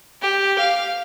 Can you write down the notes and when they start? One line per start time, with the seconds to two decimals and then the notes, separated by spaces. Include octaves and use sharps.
0.22 G4
0.58 F5